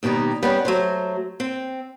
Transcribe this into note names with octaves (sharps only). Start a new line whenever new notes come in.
D#2 B2 D#3 G3 D#4
G3 B3 C#4
F#3 A3 C5
C4